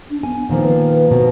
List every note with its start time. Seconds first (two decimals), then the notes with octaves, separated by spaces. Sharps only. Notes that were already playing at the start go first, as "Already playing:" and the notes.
0.11 D4
0.23 B3 G#5
0.49 A#2 D#3 F3
0.62 B4
1.11 B2